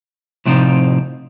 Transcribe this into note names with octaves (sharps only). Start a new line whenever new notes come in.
A2 C3 F3 C4 D#4 F4